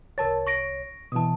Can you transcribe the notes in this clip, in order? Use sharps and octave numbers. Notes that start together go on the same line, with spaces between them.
C2 A#4 C#5 A5 A6
C#6 A#6 D7
B2 E3 A5 D#6